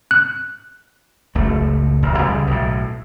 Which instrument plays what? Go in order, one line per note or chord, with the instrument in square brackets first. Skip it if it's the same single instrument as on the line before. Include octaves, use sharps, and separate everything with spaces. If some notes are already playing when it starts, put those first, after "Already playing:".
[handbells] F#6
[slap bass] F#1 C#2 A3
D#1 A1
C#2 C#3 G3
B1 A2